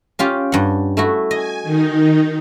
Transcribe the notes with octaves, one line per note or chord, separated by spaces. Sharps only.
C#4 F4 G4
G2 F#5
A3 E4 F#4
D#5 G#5
D#3 D#4